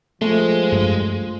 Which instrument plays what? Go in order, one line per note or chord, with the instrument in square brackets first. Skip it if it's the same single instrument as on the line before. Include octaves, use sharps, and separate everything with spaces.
[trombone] F3 [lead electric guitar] G#3 [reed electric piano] A3
[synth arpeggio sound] G2